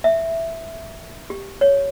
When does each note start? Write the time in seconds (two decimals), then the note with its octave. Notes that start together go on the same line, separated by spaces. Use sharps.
0.04 E5
1.30 G4
1.61 C#5